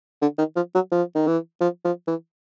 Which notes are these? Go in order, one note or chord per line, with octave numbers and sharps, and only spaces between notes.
D3
D#3
F3
F#3
F3
D#3
E3
F3
F3
E3